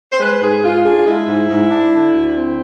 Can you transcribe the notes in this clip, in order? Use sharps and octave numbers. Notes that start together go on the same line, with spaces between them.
C5
G#3 B4
G#2 G#4
G#2 F4
D4 G#4
F4
G#3 E4
G#2
G#2
D4
D3
D2
C4